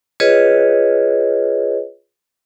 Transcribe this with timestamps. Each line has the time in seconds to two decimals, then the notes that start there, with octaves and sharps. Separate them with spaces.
0.20 F4 G#4 B4 C#5 D#5